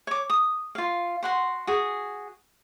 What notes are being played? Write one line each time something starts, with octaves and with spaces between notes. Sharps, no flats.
C#5 D6
D#6
F4 F5
F#4 F#5 C6
F#4 G#4